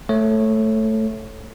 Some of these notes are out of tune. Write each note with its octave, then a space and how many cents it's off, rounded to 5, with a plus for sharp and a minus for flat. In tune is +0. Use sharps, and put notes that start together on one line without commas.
A3 +0 C#5 -15